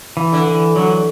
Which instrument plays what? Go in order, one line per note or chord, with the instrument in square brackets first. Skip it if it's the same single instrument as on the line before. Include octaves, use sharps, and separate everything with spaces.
[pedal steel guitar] E3
[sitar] D3
[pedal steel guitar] E3
[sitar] D3 [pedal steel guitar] F#3